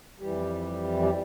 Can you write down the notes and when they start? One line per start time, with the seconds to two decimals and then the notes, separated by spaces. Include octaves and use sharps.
0.20 F2 E3 G3 G4
1.02 G4